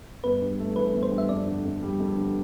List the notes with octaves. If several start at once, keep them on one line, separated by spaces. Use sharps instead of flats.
G1 B4
G2
A3
E3 B4
G1
C5
G2
E5
F2 D5
D3
F2
G3
F2
D3